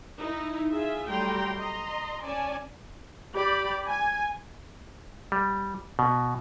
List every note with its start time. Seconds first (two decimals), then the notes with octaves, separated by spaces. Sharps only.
0.20 D#4 E4
0.71 F4 G#4 E5
1.10 F#3 G3 A3 G5 A#5 C6
1.58 D#5 A#5 C6
2.24 C#4 D5 G#5 A5
3.35 G4 D5 B5
3.88 G#5
5.32 G3
5.99 B2